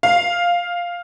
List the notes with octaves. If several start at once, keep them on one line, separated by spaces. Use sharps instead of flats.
F5